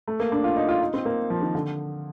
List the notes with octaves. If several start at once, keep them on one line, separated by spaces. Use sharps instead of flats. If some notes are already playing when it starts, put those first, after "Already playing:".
A3
A#3
D4
F4
D#4
F4
D#4
C4
A#3
F3
D#3
D3